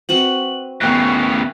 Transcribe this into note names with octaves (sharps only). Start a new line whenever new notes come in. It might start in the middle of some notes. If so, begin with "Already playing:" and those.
C4 F#4 B4 F#7
D#2 A2 C#3 B3 A#4 G5 F#6